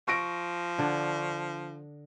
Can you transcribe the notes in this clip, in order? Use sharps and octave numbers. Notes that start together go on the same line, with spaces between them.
F3 C#6 A#6 D7
D3 D4